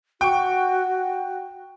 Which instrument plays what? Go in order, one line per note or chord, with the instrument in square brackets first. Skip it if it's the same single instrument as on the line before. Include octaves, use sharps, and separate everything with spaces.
[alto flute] F#4 [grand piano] G5 C#6